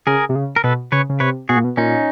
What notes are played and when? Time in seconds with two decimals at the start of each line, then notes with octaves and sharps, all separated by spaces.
0.07 C#3 G#4 A#4
0.29 C3
0.35 C#3
0.56 A#4
0.64 B2 A4 B4
0.92 C#3 B4 C#5
1.09 C#3
1.20 C3 B4 C#5
1.49 B2 F#4 G#4
1.56 A#2
1.64 B2
1.77 A#2 C#4 D#4